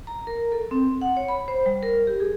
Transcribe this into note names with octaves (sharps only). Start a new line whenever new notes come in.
A#5
A#4
A4
C4
F#5
C#5
B5
C5
G3
A#4
G4
G#4